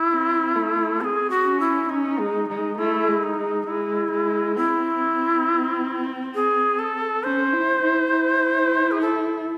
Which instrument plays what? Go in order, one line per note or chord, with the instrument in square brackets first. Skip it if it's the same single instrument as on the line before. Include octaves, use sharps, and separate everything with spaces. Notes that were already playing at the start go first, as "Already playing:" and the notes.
Already playing: [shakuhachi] E4
[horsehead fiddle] C4
A3
[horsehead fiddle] C4 [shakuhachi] A4
[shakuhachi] G#4
F#4
[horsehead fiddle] C#4
[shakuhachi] E4
[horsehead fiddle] C#4 [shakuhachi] D#4
[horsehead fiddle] G#3
G#3
[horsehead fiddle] A3 [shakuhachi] E4
[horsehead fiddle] G#3
[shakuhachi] D#4
[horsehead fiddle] G#3
[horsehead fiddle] G#3 [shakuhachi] E4
[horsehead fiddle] G#3
[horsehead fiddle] C4 [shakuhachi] E4
[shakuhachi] G#4
A4
[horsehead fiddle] C#4 [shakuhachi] C5
[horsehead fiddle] E4
E4
E4
[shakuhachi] G#4
A4